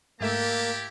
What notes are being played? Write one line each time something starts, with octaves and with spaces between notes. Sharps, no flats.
G#2 A3 A#3 E4 G4 A5 E6